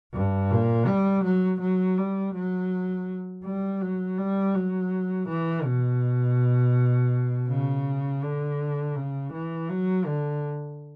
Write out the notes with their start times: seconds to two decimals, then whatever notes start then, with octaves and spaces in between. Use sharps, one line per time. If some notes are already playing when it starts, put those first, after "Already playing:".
0.13 G2
0.51 A#2
0.87 G3
1.24 F#3
1.61 F#3
1.98 G3
2.35 F#3
3.45 G3
3.81 F#3
4.18 G3
4.55 F#3
5.28 E3
5.64 B2
7.49 C#3
8.22 D3
8.96 C#3
9.33 E3
9.69 F#3
10.06 D3